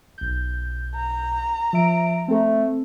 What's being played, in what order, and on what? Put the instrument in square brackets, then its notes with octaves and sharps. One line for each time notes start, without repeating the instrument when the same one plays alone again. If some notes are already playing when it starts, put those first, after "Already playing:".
[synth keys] B1 G6
[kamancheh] A#5
[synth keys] F3 E5 D7
[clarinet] A3 [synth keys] C4 A4